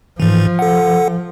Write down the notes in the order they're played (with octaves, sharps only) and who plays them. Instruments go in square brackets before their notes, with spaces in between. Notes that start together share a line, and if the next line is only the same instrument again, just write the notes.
[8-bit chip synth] G#2 E3 [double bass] F3
[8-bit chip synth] A4 F#5